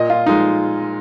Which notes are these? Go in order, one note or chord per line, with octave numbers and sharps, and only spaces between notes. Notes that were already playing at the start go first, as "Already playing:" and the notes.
Already playing: A#2 D#5
F4
F3 G#3 D#4